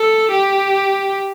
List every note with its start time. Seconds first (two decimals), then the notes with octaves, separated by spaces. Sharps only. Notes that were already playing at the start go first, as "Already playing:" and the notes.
Already playing: A4
0.32 G4